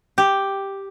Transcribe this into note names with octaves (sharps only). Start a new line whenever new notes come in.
G4